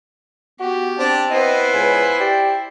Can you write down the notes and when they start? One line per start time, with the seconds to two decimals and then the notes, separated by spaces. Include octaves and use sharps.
0.60 B3 F#4 G4
0.99 C4 D4
1.30 B3 E4 C5 D#5
1.74 C#2 G#5
2.20 G4 D5